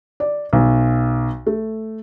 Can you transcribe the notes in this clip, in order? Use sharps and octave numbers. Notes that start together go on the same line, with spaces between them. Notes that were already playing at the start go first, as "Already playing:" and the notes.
D5
B1
A3